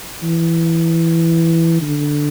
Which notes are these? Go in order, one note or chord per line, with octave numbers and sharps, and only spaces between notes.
E3
D3